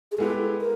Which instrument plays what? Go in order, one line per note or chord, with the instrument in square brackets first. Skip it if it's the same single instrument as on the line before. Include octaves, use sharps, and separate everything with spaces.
[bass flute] G#4
[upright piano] G#3 B3 E4 G4 [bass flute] A4
[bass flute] A#4